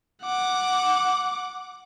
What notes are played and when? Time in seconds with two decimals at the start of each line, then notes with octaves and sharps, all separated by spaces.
0.24 F#5 D6